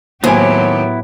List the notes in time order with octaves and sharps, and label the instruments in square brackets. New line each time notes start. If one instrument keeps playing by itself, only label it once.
[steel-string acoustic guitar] D#2 [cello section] A2 F#3 G4 [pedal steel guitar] B3 E4 [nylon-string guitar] C4 G#5